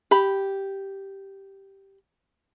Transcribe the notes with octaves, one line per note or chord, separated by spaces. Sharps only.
G4 B5